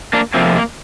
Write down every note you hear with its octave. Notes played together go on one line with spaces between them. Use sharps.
A#3 D4
F2 C3 F3 A#3 C4
A#3